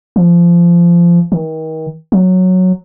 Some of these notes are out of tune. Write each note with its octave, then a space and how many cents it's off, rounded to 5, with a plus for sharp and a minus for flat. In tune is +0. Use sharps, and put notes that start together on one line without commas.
F3 -20
D#3 +35
F#3 -5